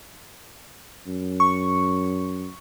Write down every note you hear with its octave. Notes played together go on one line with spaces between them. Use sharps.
F#2
C#6